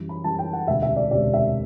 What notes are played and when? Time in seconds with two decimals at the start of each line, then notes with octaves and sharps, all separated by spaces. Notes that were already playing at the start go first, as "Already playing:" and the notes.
Already playing: F#2 E3 G3
0.09 B5
0.24 F#2 E3 G3 A5
0.39 G5
0.53 F#5
0.67 E1 D2 C3 E5
0.82 E5
0.96 D5
1.11 E1 D2 C3 D5
1.33 E5